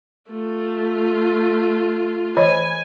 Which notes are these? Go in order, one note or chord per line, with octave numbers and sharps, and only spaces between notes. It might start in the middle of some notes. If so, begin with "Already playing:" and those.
A3 F4
E3 C#5 D#5 G#5